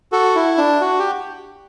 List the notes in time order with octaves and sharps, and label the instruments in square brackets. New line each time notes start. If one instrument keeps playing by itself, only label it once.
[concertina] F#4 A4
E4
D4
F#4
G4